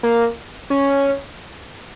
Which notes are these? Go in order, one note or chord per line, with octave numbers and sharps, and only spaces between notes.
A#3
C#4